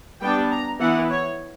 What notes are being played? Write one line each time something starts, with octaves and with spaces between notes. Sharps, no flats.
G3 B3 D4 G5
A#5
E3 B3 E4 F#5
C#5